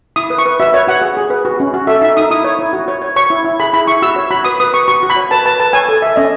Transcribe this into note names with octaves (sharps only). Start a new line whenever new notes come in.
E4 D#6
B4
C#6
B4
F#4 E5
B4 C#5
F#4 F#5
G#4
G#4
B4
F#4
C#4
F#4
A4 E5
D#4 E5
D#4 D#6
E4 D#6
C#5
E4
F#4
C#5
C#5
C#5 C#6
E4
E4
G#4 B5
E4 B5
E4 C#6
F#4 E6
C#5
F#4 B5
B4 D#6
B4 D#6
B4 C#6
F#4 C#6
F#4
B5
C#5
B4 A5
B4 A5
B4 A5
C#5 G#5
A4
A4 E5
C#4 D#5